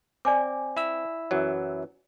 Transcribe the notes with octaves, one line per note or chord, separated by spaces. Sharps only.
C4 D5 G#5 D6
E4 E5 E6
F#2 E3 F#3